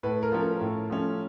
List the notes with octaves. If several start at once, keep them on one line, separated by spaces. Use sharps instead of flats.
A2 B4
A#4
F3 A3 C#4
A#4
A2
F3 A3 C#4